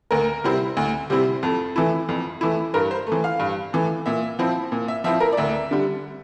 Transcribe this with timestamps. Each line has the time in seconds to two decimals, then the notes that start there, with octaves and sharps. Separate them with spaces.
0.11 D2 A#4
0.44 C3 G3 C4 E4
0.77 D2
1.10 C3 G3 C4 E4
1.43 F2 A4
1.76 E3 A3 E4
2.09 F2
2.41 E3 A3 E4
2.74 G2 A#4
2.91 C5
3.07 A3
3.12 E3
3.24 F5
3.40 G2
3.73 E3 A3
4.06 A#2 E5
4.39 F3 C4 E4
4.72 A#2
4.88 E5
5.04 F3 C4 E4 E5
5.20 A#4
5.33 D5
5.37 D2 E5
5.71 D3 G3